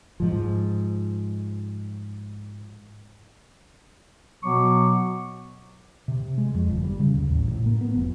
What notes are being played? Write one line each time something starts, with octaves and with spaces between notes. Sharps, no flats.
G#2 F3
B2 F#3 B3 C#6 D6
C3
G#3
F2
G1
G3
C#3
D#2
A1
A2
A#3
B3
F1